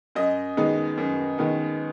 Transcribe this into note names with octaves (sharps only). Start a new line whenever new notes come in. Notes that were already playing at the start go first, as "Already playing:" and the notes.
F#2 D#5
D#3 G#3 B3 D#4
F#2
D#3 G#3 B3 D#4